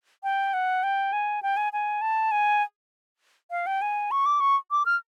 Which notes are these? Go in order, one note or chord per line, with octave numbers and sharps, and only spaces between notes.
G5
F#5
G5
G#5
G5
G#5
G#5
A5
G#5
F5
G5
G#5
C#6
D6
C#6
D6
F6